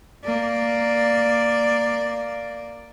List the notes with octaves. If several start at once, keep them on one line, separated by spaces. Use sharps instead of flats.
A#3 D5